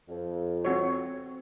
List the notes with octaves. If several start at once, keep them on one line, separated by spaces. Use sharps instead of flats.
F2
C4 F#4 C#5